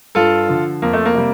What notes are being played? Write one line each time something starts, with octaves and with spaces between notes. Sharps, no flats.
G2 F4 A4
D3 F3
F2 A#3
A3
A#3
C3 G3